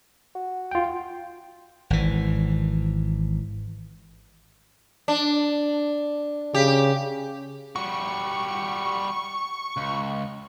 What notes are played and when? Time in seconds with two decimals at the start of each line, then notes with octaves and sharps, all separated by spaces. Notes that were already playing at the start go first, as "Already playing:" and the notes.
0.35 F#4
0.71 F4 G5
1.90 G#1 E3
5.08 D4
6.55 C#3 G4
7.76 G3 F#4 C#6
9.77 C#2